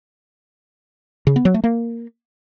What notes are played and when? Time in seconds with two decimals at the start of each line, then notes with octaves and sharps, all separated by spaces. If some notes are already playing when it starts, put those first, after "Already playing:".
1.27 C#3
1.36 B3
1.45 F#3
1.54 A3
1.64 A#3